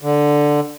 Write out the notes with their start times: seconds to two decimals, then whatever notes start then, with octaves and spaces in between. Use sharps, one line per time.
0.02 D3